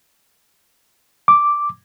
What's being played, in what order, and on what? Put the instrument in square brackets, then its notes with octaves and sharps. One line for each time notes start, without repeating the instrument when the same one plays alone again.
[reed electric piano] D6